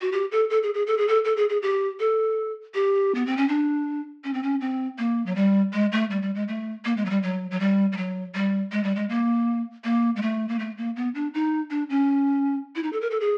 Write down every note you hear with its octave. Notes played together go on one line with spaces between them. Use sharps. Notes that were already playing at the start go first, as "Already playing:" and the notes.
F#4
G4
A4
A4
G#4
G#4
A4
G#4
A4
A4
G#4
G#4
G4
A4
G4
B3
C4
C#4
D4
C#4
C4
C#4
C4
A#3
F#3
G3
G#3
A3
G3
G3
G#3
A3
A#3
G#3
F#3
G3
F#3
F#3
G3
G3
F#3
G3
G#3
G3
G#3
A#3
A#3
G#3
A3
A#3
A3
A#3
B3
D4
D#4
D4
C#4
E4
D#4
A4
A#4
A4
G#4